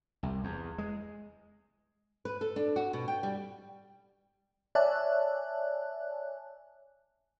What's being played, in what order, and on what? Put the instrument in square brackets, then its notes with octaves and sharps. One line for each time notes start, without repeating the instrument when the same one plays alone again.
[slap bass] C2
E2
G#3
[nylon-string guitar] B4
A4
D4
F#4
B2
G5
G3
[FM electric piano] C#5 D5 E5 G#5 A5 F#6